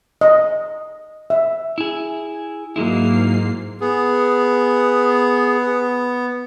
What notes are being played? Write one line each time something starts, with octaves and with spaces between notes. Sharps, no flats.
D#5
E5
E4 G#4
G#2 F#3 G#3 A#3 E4 C7
B3 G#4